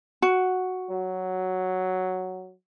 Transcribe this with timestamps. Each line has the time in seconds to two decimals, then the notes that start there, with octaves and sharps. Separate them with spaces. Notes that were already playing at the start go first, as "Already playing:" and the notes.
0.22 F#4
0.90 F#3